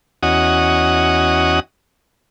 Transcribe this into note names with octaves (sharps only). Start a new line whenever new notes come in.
E2 C#4 F#4 D#5 F#5 D#6